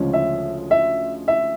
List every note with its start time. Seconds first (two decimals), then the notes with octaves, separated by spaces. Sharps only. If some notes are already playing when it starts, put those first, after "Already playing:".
Already playing: D2 C#3 F3 G#3 C#4
0.13 E5
0.71 E5
1.28 E5